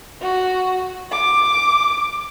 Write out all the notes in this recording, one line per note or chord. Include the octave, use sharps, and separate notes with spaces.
F#4
D6